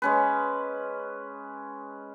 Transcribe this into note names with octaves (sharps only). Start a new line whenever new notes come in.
G#3 C#4 B4